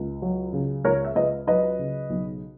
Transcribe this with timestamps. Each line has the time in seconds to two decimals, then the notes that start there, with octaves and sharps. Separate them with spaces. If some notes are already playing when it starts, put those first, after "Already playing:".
Already playing: C#2
0.22 F#3
0.53 C#3
0.85 C#2 A#4 C#5
1.05 E5
1.16 C#2 B4 D#5
1.47 F#3 B4 D#5
1.79 C#3
2.10 B1